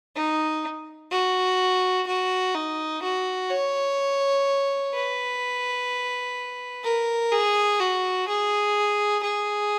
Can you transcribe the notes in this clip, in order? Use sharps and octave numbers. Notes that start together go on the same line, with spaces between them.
D#4
F#4
F#4
D#4
F#4
C#5
B4
A#4
G#4
F#4
G#4
G#4